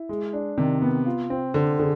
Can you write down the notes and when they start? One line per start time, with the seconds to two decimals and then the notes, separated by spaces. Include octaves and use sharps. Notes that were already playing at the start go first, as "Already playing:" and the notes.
Already playing: E4
0.09 G#3
0.33 D4
0.57 C3 D#3
0.82 B3
1.06 F4
1.30 C4
1.54 D3 C4
1.79 D3 G#4